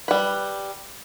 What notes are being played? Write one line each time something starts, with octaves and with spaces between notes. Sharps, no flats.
G3 B4